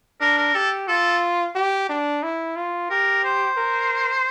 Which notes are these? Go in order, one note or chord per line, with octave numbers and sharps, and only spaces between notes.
D4 A#4
A#4
G4 A4
F4 A4
G4
D4
E4
F4
G4 A#4
C5
A#4